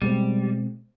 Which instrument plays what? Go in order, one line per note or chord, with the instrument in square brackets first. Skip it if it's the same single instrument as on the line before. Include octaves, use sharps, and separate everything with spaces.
[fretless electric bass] B2 G#3 C4 [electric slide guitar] G3